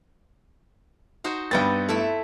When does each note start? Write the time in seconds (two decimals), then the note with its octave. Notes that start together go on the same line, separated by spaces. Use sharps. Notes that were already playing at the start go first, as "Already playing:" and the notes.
1.24 D#4 F#4 C5
1.51 G2 B3 C4 D#5 G5 A6
1.89 A3 E4 E5